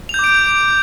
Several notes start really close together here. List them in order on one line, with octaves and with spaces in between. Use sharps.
F7 G6 D6 D7